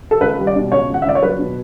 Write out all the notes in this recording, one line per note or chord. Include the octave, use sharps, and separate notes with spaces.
A4
C#2 B4
G3
D5
B2
C#2 C#5
C#2
F#5
E5
C#2 D5
C#5
F#3 B4
B2